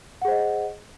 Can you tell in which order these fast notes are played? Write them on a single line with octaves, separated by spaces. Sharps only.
F#5 G#4 C5 D#5